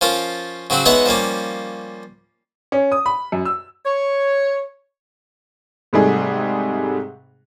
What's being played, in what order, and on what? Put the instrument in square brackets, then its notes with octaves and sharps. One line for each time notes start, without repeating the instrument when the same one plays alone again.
[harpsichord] F3 C#4 F4 A#4
C#3 F#3 C4 F#4
G#3 B3 D#4 C#5 E5 F#5
F3 G3 A#3 C#4
[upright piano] C#4
D#6
B5
F#2
E6
[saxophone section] C#5
[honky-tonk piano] G#2 C3 G3 A3 D#4 G#4